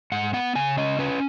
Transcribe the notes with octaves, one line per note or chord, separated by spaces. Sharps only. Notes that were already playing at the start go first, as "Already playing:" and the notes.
G#2 F#5
B3 F#5
C#3 G#5
C#4 D#5
C#4 B4